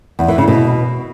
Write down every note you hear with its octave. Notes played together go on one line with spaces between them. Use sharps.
E2
E3
C#3
B2